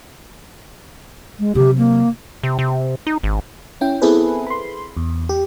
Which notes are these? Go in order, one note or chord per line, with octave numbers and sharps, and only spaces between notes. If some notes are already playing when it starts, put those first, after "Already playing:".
G#3
C3 F#3 G4
A#3
C3
C3
D#4
G#1
C#4 E4 G5
B3 C4 E4 G#4 A4 B4
B5 C6
E2
G4